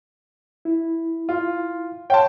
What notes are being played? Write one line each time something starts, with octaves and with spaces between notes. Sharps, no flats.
E4
F4
C#5 F5 G5 A5 C6